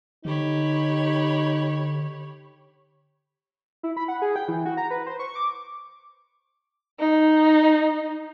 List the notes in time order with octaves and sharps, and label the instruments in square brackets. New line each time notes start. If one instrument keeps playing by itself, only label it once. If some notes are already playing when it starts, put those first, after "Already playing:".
[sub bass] D3 [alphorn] D#4 [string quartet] G4 C#5 B5
[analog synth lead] E4
B5
F#5
G#4
G5
E3
F#4
A#5
B4
C5
C#6
D6
[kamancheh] D#4